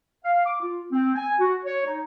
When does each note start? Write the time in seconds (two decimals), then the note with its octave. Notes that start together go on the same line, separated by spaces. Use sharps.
0.24 F5
0.46 D6
0.61 F4
0.92 C4
1.15 G#5
1.40 F#4
1.65 C#5
1.86 D#4